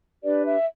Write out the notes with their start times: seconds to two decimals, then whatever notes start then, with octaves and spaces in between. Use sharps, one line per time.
0.23 D4 G4 B4 D5
0.46 E5